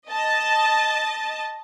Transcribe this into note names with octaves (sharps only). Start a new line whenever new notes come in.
D#5 A5